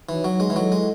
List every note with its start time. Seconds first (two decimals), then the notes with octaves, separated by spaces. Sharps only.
0.08 E3 D#4 F#4 C#5
0.24 F#3
0.40 G#3
0.50 E3
0.56 F#3 E4 A4 D#5 F#5
0.72 G#3